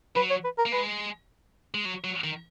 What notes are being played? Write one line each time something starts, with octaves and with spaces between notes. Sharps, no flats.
F#3 B4
C#5
B4
A#4
A#3
G#3 B4
G#3
F#3
F#3
D#3